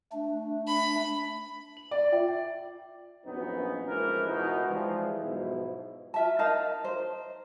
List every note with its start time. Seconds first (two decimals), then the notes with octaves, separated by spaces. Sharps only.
0.12 A3 D4
0.68 B5
1.77 F#7
1.91 D5
2.12 F4 E5 G5
2.29 G5
3.25 A#1 F#2 B3 C#4 D#4
3.88 A1 E3 F3 G#3 A#4
4.28 C#2 B2 E3 B3 D#4
4.67 E3 F3 G3 G#3
5.20 B1 G#2 B2 F3 E4
6.14 F4 E5 A5
6.39 D#4 A#4 F5 A5
6.85 C5